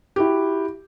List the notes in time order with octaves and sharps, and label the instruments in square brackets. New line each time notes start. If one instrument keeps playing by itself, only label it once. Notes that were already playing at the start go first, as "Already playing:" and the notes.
[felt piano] E4 F#4 G4